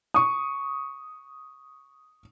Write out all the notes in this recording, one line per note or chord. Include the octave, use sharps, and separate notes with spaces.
C#6 D#6